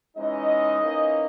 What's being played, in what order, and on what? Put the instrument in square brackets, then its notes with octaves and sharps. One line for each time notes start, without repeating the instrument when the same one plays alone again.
[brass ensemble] E3 G#3 C#4 D#4 D#5
E3 A#3 C#4